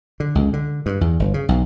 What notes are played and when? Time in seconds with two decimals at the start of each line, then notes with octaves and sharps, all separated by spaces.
0.20 D3
0.35 C#2
0.53 D3
0.86 G2
1.01 E2
1.19 G1
1.34 C#3
1.49 B1